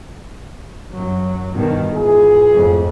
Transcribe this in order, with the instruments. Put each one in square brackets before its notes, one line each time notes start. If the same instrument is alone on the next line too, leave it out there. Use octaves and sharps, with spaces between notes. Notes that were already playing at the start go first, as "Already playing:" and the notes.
[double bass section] F#2 F#3
G2 B2 D#3
[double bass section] G#2 [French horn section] E3 F4 G#4
[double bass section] F2 A2